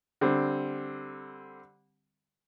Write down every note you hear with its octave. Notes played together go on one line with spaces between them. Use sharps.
D3 G3 C4